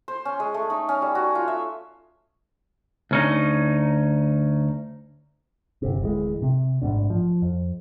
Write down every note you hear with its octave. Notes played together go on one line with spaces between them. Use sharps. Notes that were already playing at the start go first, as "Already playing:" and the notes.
C5
C#4
G#3
A3
D#4
C#4
G3
F#4
F4
E5
D2 C#4 D#4
G1 C3
D1 E3 G#3
C3
A1 G#2 B2 D4
F3
F2